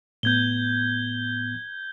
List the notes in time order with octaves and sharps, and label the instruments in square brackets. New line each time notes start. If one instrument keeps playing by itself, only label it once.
[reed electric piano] A2 B3 [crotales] G6 G#6 G7